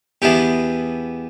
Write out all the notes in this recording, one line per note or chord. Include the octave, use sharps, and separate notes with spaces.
E2 E3 B3 D4 G4